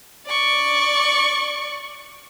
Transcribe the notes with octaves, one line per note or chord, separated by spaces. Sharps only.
D5 C#6